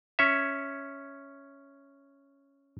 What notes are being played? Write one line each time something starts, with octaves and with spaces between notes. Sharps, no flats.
C#4 C#5 E5